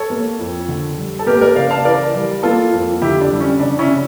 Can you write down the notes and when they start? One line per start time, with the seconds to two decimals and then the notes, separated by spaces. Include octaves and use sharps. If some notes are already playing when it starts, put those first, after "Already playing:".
Already playing: A4 C#5
0.10 A#3
0.39 F2
0.68 D3
0.98 G3
1.19 A4
1.26 A#3 G4 A#4
1.41 A#4 D5
1.56 C#3 D5 F5
1.70 F5 A5
1.85 E3 A#4 D5
2.14 G3
2.43 A#3 F4 A4
2.72 F2
3.02 D3 E4 G4
3.21 D4
3.31 G3
3.40 C#4
3.60 C#3 D4
3.79 C#4 E4
3.89 C#3